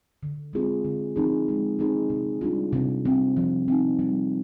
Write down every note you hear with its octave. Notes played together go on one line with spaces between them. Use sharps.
D3
G#3 C4 F4 G#4
D3
F3 C4 D#4 G#4
G#3
C4 D#4 G#4
C3
G3 D4 F4
C3
G3 C4
F3
C4 D#4
G3